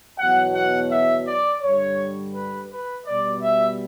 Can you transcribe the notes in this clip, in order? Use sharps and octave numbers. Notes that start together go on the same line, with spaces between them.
E2 B2 F#3 F#5
F#5
E5
D5
G2 D3 G3 C#5
B4
B4
B2 G3 D5
E5